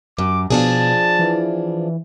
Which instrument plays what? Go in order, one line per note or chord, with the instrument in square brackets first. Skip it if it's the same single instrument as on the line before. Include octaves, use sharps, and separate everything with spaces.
[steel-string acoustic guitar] F#2 [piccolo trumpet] D6
[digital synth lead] B2 [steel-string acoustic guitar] F3 D4 G#4 [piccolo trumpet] A5
[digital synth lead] E3